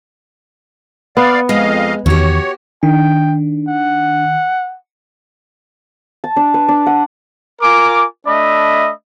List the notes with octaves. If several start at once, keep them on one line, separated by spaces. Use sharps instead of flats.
B3 D5 F5
F2 G#3 D#5 F5
E2 D#3 F#4 G4 C#5
D#3 D4 G5
F#5
A5
D4
B4
D4
F#5
F4 A#4 G#5 D6
A3 D4 D#5 E5 B5